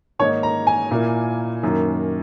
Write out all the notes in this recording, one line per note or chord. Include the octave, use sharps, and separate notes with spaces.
G#2 D#3 A#3 D#4 C#5
A#5
G#5
A#2 A#3 E4
F#2 D#3 A#3